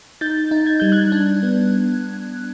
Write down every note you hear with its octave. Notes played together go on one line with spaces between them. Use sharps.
D#4 G6 A6
D#4
G#6
G3 G6
F#6 G#6
D4
B3